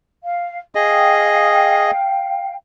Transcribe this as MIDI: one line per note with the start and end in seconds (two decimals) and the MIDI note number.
0.24 0.60 77
0.75 1.91 68
0.75 1.91 75
0.75 2.54 77
0.75 2.54 79